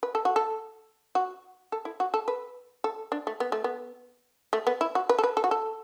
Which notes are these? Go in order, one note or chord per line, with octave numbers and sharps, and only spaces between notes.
B4
A4
F#4
A4
F#4
A4
E4
F#4
A4
B4
A4
D4
A3
B3
A3
B3
A3
B3
E4
F#4
B4
A4
B4
A4
F#4
A4